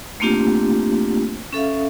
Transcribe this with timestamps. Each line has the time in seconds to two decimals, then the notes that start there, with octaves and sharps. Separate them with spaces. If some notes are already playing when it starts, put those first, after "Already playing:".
0.20 A3 A#3 C4 D4 F4 G4
1.53 C#4 A4 E5 F5